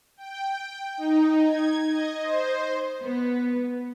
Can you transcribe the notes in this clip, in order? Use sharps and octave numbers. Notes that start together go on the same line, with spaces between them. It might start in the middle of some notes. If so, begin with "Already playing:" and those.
G5
D#4
G#6
D#5
C5
B3